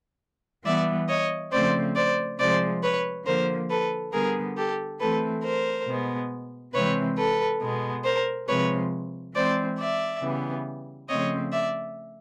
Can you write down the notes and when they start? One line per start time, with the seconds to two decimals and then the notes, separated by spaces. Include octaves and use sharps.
0.66 E3 G3 B3 D5 E5
1.09 C#5 D#5
1.52 C#3 F3 A3 C4 C5 D5
1.96 C5 D5
2.39 C3 F3 G#3 C5 D5
2.83 B4 C#5
3.26 D3 F3 A#3 A#4 C5
3.70 A4 B4
4.13 D3 G3 B3 G#4 A#4
4.57 G4 A4
5.00 E3 A3 C4 A4 B4
5.44 A#4 C5
5.87 B2 G#3 B3
6.74 C3 E3 G#3 C4 B4 C#5
7.18 A4 B4
7.61 B2 G#3 B3
8.05 A#4 C5
8.48 C3 F3 G#3 B4 C#5
9.35 E3 G#3 C4 C5 D5
9.78 D5 E5
10.22 C#3 E3 G3 B3
11.09 C#3 F3 A3 C4 C#5 D#5
11.52 D5 E5